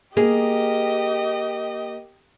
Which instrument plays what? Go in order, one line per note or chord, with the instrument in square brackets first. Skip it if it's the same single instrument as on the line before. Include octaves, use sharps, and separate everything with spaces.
[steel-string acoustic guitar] A#3 [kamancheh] G4 D#5 [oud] G#4